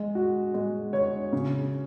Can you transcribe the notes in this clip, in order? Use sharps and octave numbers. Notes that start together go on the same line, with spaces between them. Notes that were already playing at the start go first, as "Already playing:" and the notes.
Already playing: G#3
F#4
G#3
C#5
C#3